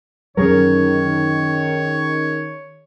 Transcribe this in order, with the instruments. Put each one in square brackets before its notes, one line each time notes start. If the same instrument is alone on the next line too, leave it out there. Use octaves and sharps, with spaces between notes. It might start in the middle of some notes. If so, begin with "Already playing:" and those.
[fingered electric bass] F#2 D3 F#3 [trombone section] D#3 [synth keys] C#4 G#4 A#4 [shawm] C#5